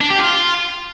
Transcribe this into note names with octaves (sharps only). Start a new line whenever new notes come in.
D4
G4
F4